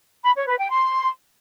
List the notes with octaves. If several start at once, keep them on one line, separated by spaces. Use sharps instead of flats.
B5
C#5
B4
G5
C6